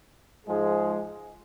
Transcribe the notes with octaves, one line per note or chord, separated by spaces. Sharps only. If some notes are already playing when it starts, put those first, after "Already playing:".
G#2 F3 G#3 G#4